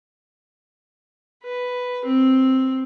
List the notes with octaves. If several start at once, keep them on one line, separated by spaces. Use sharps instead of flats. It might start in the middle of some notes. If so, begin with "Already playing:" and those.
B4
C4